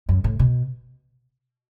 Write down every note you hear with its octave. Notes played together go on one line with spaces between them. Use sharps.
F#2
A2
B2